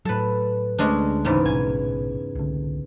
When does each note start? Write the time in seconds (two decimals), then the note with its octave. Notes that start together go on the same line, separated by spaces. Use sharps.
0.05 A2 F#3 A4 B4
0.79 D2 G#3 A3 C#4 D4
1.25 E2 G#2 C#3
1.46 A#1 B2 G#5
2.35 C2 D3